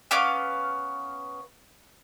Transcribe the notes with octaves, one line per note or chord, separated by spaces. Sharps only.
B3 C#4 F5 D6